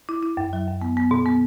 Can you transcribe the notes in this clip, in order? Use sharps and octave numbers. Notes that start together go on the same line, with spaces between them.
E4
E4
F#2
F#3
F#2
B3
B3
B2
B3